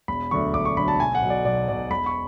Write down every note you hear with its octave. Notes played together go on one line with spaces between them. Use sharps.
E1 B5
D2 D3 F#3 C#6
E1 D6
C#6
D2 D3 F#3 B5
A5
B1 G#5
F#5
B2 F#3
D5
B1 D5
B2 F#3 D5
E1 B5
C#6